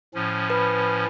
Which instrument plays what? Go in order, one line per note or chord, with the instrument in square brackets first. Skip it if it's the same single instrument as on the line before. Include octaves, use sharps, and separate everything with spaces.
[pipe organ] A2 F3 C#4
[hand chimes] B4 B5